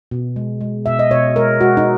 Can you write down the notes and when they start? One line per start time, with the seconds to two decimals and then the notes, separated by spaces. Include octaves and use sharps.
0.11 B2
0.36 G#3
0.61 G#3
0.86 B2 E5
0.99 D#5
1.11 B2 C#5
1.36 G#3 A#4
1.61 G#3 F#4
1.77 D#4